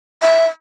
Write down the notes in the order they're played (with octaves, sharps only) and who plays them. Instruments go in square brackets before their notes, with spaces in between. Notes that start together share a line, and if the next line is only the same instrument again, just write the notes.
[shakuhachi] E5